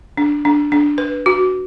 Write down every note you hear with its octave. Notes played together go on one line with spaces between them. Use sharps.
D4
D4
D4
B4
F#4